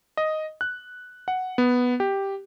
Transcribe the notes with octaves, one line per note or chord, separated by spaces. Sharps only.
D#5
F#6
F#5
B3
G4